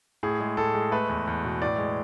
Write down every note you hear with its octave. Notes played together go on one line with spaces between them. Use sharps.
A2 G#4
G#3
A2 A4
G#3
A3 B4
E2
E2
B2
A2 D5
G#3